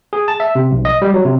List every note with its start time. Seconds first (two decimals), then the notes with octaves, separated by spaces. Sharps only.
0.13 G#4
0.28 A5
0.40 E5
0.55 C3
0.72 B1
0.85 D#5
1.02 G3
1.14 F#3
1.25 C3